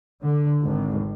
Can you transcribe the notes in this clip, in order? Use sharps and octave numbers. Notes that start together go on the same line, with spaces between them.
D3
G#1